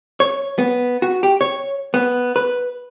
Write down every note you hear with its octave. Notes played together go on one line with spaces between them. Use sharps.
C#5
B3
F#4
G4
C#5
B3
B4